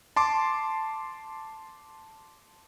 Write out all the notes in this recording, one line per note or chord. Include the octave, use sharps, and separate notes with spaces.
A5 C6 D6